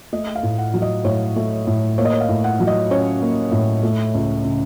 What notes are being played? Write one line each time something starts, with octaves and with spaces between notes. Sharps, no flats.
A3 D#5
F5
A2
F#5
F#3
D#5
A2 C#5
A3
A2
A#3 C#5
D#5
C#5
F5
A2
F#5
F#3
D#5
C#4 C#5
A#3
A2
A3
C#2
C#3